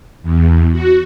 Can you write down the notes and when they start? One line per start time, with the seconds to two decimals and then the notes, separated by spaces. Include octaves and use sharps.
0.23 E2
0.72 F#4